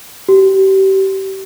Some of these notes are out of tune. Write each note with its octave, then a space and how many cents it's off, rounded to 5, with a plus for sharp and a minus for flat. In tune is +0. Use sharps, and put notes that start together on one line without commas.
G4 -30